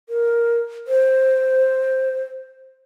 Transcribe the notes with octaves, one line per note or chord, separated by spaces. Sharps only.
A#4
C5